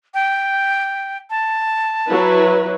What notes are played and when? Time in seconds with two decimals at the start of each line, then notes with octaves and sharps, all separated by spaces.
0.14 G5
1.30 A5
2.08 F#3 E4 B4